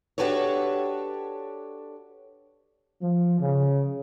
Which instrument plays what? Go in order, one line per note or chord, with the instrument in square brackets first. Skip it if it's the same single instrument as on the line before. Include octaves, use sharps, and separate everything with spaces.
[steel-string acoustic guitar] D4 F#4 G4 A4 B4 C#5
[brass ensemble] F3
C#3